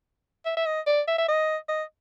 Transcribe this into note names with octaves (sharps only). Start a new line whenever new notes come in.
E5
E5
D#5
D5
E5
E5
D#5
D#5